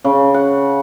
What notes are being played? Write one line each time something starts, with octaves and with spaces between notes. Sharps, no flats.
C#3
F#5